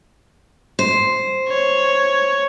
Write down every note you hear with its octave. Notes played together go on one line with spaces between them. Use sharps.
C5
C#5